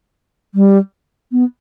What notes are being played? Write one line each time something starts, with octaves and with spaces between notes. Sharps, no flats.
G3
B3